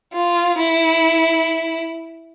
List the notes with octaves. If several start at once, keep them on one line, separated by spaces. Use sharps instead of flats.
F4
E4